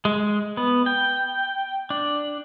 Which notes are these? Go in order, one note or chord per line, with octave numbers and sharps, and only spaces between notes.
G#3
B3
G5
D4